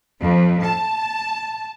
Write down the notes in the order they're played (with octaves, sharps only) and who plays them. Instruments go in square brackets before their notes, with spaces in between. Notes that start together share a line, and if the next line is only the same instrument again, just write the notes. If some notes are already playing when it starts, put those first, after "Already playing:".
[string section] F2
A5